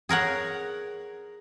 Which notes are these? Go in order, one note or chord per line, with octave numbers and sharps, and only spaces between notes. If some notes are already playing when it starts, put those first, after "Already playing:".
G#4 A#4 C#5 F#5